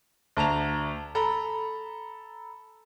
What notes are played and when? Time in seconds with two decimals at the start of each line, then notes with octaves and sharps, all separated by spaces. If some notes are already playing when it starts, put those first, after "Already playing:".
0.37 D2 A5 A#5 F7
1.15 A4 A#5 B5